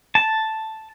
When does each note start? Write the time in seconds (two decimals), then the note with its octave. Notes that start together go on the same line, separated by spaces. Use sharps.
0.15 A5